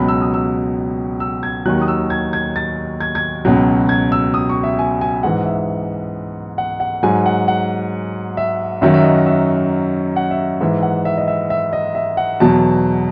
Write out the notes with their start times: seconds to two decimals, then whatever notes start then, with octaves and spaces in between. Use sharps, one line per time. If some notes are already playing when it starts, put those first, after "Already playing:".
Already playing: C#2 B2 F#3 B5
0.08 E6
0.21 D#6
0.34 E6
1.20 E6
1.43 G#6
1.65 D#2 D#3 F#3 F#6
1.81 D#6
1.88 E6
2.10 G#6
2.33 G#6
2.56 A6
3.00 G#6
3.15 G#6
3.45 C#2 B2 F#3
3.89 G#6
4.12 E6
4.34 D#6
4.49 C#6
4.64 E5
4.79 G#5
5.01 G#5
5.23 G#2 E3 F#5
5.46 E5
6.58 F#5
6.80 F#5
7.03 G#2 F#3 G#5
7.26 F#5
7.48 F#5
8.37 E5
8.82 F#2 D#3 F#3 E5
8.94 E5
9.04 D#5
9.26 E5
10.16 F#5
10.31 E5
10.61 G#2 E3 E5
10.82 F#5
11.05 E5
11.18 D#5
11.28 E5
11.50 E5
11.73 D#5
11.95 E5
12.17 F#5
12.40 E2 B2 F#3 A5